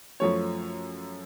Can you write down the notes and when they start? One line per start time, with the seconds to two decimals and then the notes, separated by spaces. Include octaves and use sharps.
0.20 F#2 F3 A3 C#4 C#5